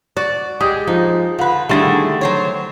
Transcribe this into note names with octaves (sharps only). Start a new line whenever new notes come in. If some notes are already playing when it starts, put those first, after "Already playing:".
F#4 D5
G#3 G4 D#6
F3 D#4
D3 F4 B4
D3 D#3 G3 A3 E4 F4 G#4 A6
F#3 C5 C#5